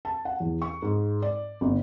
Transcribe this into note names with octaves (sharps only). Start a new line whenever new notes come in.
A5
F#5
E2
C#6
G#2
D5
G1